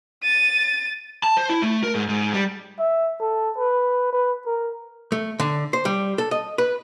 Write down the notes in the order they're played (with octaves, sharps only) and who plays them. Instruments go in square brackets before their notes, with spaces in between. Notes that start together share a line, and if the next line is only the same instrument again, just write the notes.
[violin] A6 D#7
[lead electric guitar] A5
C5
E4
A3
A#4
G#2
G#2
G3
[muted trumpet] E5
A4
B4
B4
A#4
[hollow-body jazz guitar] A3
D3
C5
G3
A4
D#5
B4